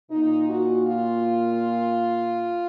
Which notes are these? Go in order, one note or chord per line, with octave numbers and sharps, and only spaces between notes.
A#2 D#4
F#4
F4